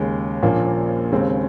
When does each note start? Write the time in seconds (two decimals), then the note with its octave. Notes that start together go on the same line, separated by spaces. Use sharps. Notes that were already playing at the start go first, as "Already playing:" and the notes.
Already playing: D#2 C#3 G#3
0.42 A#1 A#2 F3 A#3 C#4
1.12 D#2 C#3 G#3 C4